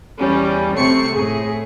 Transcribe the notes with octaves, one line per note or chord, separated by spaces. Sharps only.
E2 G3 C#4
C3 A3 C4 C#6 C7 C#7
A2 G#4